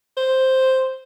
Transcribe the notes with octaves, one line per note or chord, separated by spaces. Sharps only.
C5